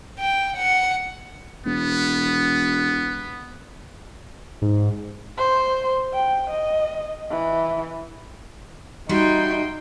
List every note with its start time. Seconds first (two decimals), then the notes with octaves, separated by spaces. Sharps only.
0.19 G5
0.57 F#5
1.66 E1 B3
4.62 G#2
5.38 C5
6.14 G5
6.50 D#5
7.31 E3
9.09 G3 D#4 E4 F#4 G5 C6